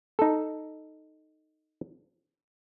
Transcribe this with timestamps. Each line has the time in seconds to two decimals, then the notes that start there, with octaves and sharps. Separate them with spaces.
0.19 D#4 A4